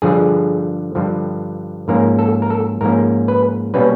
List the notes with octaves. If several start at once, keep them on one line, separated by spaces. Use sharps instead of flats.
G2 D3 F3 G#4
G2 D3 F3
G#2 F3 A#3 C#4 A#4
A4
A#4
A4
G#2 F3 A#3 C#4 A#4
B4
B2 G3 A#3 C#4 B4